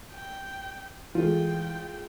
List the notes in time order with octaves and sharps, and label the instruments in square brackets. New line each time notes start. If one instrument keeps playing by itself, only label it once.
[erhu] G5
[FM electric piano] E3 [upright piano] G#3 A3 F4 [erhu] G5